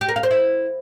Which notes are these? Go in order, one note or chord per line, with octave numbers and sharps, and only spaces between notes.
G4
A#4
F5
C5
E4